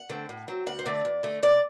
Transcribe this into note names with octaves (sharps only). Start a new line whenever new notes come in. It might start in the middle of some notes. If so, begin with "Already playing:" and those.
Already playing: F#5
D3 A3 C4
A2
F#3 C4
D2 F#5
C5
D3 A3 C4 D5
E2
D3 A3
C3 D5